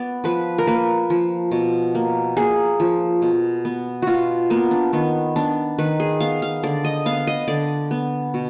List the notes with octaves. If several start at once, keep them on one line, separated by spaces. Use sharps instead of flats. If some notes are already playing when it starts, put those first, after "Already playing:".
Already playing: B3 D5
F3 B4
A#4
A#3 B4
F3
B2
A#3
A#3 G#4
F3
B2
B3
B2 F4 F#4
A#3 B3
D4
D#3 B3
B3 D4
D#3 B4
G#4
B3 F5
F5
D3 D5
D#5
B3 F5
D#5
D3 D5
B3
B2